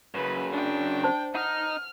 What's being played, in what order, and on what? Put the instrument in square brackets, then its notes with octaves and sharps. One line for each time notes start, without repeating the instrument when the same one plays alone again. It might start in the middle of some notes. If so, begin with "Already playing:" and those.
[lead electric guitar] F#2 C#3 [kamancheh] B4
[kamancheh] D4 G5
[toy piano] C5 A5
[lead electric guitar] D#4 [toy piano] F#5 [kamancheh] F6